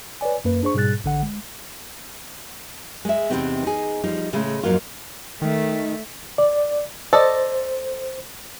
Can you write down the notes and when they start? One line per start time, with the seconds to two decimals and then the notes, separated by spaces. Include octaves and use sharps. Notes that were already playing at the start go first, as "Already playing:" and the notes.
0.21 B4 C#5 D5 G#5
0.45 F#2 A#3 B4
0.63 D4 G#4 C5 C#6
0.74 G#2 B2 G3 G#4 F#6 A6
1.04 A1 D3 F#5
1.23 G#3
3.05 G#3 E5
3.30 E2 C3 F3 B3 C4 D#4
3.63 D#4 G#4
4.03 F3 G3 D#4
4.33 A2 C#3 G#3 A3
4.63 F2 G#2 F#3 A#3 F4
5.42 D#3 A3
6.38 D5
7.13 A4 C5 D5 D#5